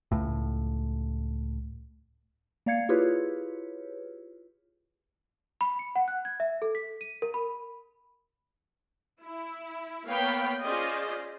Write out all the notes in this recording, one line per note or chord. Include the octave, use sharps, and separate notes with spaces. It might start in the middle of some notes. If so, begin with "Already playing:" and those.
C#2 A2
A#3 D5 F5 G#6 C#7
E4 F4 G4 G#4 B4 C#5
B5
C#7
F#5
F#6
G#6
E5
A4
B6
D#7
A#4
B5
E4
A#3 B3 C#5 F5 G5 B5
C#4 F4 G#4 C5 D5 D#5